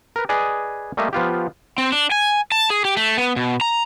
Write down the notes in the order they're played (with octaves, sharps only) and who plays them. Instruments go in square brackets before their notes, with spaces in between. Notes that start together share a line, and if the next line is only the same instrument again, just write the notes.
[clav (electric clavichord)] A#4 B4
G#4 B4 D5 D#5 G#5
G3 A3 A#3 D#5 E5
F3 B3 F4 G4
[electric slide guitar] C4
D4
G#5
A5
G#4
G4
A3
B3
B2
A#5